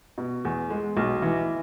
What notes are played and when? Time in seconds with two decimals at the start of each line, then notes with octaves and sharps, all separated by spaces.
0.18 B2
0.45 E2
0.70 G#3
0.97 B1
1.22 E3